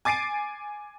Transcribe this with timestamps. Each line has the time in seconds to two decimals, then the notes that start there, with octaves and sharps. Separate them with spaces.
0.05 G#5 D6 A6 C7 D7 D#7